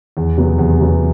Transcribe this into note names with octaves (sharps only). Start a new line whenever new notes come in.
E2
C3 F#3 B3
E2
C3 F#3 B3